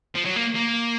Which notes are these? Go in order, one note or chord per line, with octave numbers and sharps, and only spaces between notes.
F3
F#3
A#3
A#3